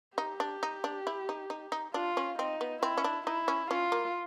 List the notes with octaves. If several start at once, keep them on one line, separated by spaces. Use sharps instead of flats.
D#4 G4
D4
D#4
D4
E4
D#4
D#4
D#4
D4 F4
C#4
C4 D#4
B3
C4 E4
C#4
D4
D#4 E4
C#4
C#4 F4
A#3